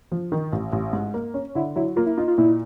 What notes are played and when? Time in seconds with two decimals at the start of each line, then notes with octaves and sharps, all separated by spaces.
0.12 F3
0.32 D#3
0.52 A1
0.72 A1
0.93 G#2
1.14 A#3
1.34 C#4
1.55 D3 E4
1.76 F#3 E4
1.96 A#3 F4
2.06 E4
2.17 D#4 F4
2.28 F4
2.38 A#2 E4